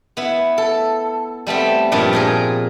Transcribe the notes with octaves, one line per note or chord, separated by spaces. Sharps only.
B3 E4
A4
G3 A3 B3 C4
G2 A#2 F3 G3
A#2 G#4 A#4